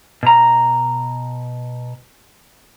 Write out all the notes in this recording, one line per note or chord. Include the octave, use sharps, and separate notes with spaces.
B2 A#5